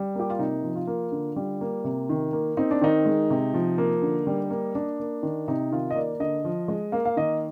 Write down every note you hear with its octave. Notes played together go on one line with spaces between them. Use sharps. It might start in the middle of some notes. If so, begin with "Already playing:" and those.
Already playing: G3
A#3 G4
F4
C3 D#4
F3
F4
A#3
D3
G3
A#3
C3
D#3
A#3
C4 D#4
D4
D#3 D#4
G#3
C3
F3
A#3
D3
G3
A#3
A#3 D4
A#3
D#3
C3 D#4
D#3 F4
D#5
A#3 D5
D3 D#5
F3
G#3
A#3 F5
F5
D#3 D#5